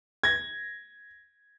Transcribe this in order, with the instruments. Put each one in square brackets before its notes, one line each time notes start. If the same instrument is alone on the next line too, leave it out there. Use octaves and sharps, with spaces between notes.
[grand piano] G#6 A#6